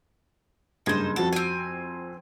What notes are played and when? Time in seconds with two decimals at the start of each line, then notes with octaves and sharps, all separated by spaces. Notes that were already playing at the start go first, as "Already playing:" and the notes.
0.86 F#1 G2 D#4 C5 G#6
1.16 F2 F#4 A4
1.33 C4 G#5